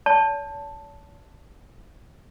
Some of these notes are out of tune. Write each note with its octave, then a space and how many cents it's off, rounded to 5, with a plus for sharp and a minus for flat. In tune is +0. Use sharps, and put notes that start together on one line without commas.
C#5 +45 A5 +0